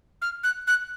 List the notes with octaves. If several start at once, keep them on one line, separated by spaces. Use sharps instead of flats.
F6
F#6
F#6